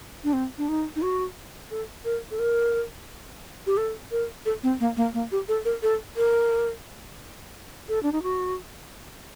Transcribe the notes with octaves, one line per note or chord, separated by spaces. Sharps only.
D4
C4
D4
D#4
D#4
F#4
A4
A#4
A4
A#4
G4
A4
A#4
A4
C4
A#3
A#3
A#3
G4
A4
A#4
A4
A#4
A4
D4
D#4
F#4